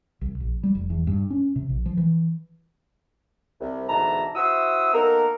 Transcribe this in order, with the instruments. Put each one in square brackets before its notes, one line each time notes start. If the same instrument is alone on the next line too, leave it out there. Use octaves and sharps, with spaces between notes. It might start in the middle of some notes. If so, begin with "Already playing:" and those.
[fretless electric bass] C2
A#1
G3
F1
E2
G2
C#4
C3
A#1
F3
E3
[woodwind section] C2
D2 G#2 B2 E3 A5 A#5
E4 F#4 C5 E5 D#6 E6
A#3 B3 D#4 A4 A#4